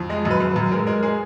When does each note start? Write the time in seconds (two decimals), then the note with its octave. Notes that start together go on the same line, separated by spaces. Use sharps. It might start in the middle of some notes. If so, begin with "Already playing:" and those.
Already playing: F2
0.10 G#3 D#5
0.25 F#2
0.31 B4
0.40 F#2
0.56 F#2
0.72 G#3 A#4
0.87 G#3 A#4
1.03 G#3 G#4